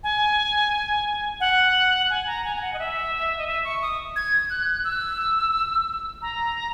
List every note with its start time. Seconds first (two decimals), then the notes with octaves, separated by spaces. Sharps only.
0.04 G#5
1.40 F#5
2.10 G#5
2.27 A#5
2.44 G#5
2.57 G#5
2.62 F#5
2.73 D#5
2.79 E5
3.38 D#5
3.47 E5
3.64 C#6
3.82 D#6
4.16 G#6
4.50 F#6
4.84 E6
6.22 A#5